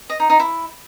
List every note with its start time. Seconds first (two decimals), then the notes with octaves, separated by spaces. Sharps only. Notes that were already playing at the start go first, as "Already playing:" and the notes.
0.10 D#5
0.20 D#4
0.30 D#4
0.40 E4